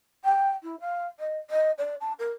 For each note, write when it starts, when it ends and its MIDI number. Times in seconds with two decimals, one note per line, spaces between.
0.25 0.50 79
0.63 0.76 64
0.80 1.06 77
1.20 1.38 75
1.50 1.71 75
1.78 1.95 74
2.01 2.13 81
2.19 2.32 70